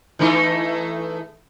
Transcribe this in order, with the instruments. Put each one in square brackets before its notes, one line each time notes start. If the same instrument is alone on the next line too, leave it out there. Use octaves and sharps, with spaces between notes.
[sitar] E3 A3 D#4